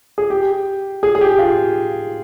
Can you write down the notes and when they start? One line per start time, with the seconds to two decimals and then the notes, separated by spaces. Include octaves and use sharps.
0.18 G#4
0.30 G4
1.03 G#4
1.15 G#4
1.21 G4
1.39 F4